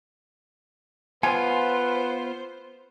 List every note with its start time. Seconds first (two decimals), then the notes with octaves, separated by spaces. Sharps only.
1.23 B3 F4 B4 C5 G#5